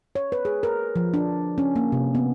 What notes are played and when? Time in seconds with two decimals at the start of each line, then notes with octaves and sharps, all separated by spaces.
0.15 C#5
0.32 B4
0.45 G#4
0.63 A#4
0.96 F3
1.14 D4
1.58 C#4
1.76 A#3
1.92 C3
2.15 B3